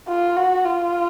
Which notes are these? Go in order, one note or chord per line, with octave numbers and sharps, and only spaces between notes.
F4
F#4
F4